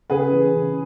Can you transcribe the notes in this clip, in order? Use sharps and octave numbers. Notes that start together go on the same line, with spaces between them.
C#3 G#4 B4
E3
C#3